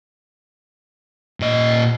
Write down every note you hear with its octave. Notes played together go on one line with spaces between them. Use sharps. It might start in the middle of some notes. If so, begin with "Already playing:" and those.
A#2 D#5